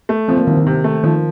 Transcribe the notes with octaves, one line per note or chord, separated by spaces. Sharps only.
A3
F3 C4
A#3
C2 D#3
D#3
C3
A3
D#3 F3